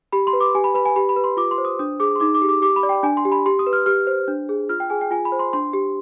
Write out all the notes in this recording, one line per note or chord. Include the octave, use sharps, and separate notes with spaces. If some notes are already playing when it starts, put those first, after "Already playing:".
G4 B5
C6
B4
D6
G4 G#5
B5
B4 B5
G#5
G4 B5
B5
B4
C6
F4 D6
C6
C5
D#6
D4 D#6
G#4 D6
C6
D#4 D6
D6
G4
D6
G4 D6
B5
D5
G5
D4 G#5
C6
G4
B5
G4 C6
D#6
B4
F6
G4 F6
C5
D4
G#4
F4 F6
G5
G#4 G#5
G5
F4 G#5
B5
C5
C6
D4 C6
G4